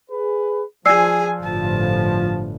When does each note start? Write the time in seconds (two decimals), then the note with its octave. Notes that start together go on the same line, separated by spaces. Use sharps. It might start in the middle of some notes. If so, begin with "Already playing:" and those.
0.11 G#4 B4
0.86 F3 G#4 D5 G#5 E6 C7
1.43 G1 A2 A5